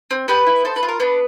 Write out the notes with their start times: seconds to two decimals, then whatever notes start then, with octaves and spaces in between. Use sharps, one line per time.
0.11 C4
0.28 B3 G4 B4
0.46 E4
0.65 A4 C5
0.76 B4
0.83 F4
0.89 A#4
1.00 B3 D4 B4